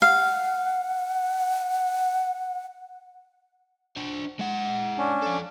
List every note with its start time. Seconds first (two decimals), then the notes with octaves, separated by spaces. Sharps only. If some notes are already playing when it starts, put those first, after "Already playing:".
0.02 F5 F#5
3.96 D4 C5
4.39 G#3 F#5
4.98 C#4 D4
5.22 F3 A4